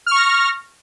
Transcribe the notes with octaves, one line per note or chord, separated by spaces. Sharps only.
C#6 F6 A#6